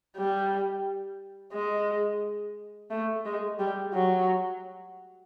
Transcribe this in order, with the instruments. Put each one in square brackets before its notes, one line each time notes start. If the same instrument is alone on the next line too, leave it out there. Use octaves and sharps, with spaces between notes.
[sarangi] G3
G#3
A3
G#3
G3
F#3